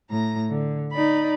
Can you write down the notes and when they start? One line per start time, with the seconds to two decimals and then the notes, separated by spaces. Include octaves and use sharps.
0.10 A2 A#5
0.50 D3
0.93 D#4 D5 B5